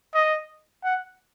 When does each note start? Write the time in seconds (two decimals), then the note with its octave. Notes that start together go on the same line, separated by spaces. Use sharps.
0.14 D#5
0.84 F#5